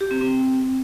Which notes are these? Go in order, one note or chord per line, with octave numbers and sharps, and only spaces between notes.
G4
C4
C4